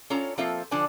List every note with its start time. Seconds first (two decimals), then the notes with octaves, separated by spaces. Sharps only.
0.10 C#4 F4 A4 C#5 A#5
0.38 F3 A#3 C4 F4 A4 E5
0.71 D3 F3 D4 A4 D5 G#5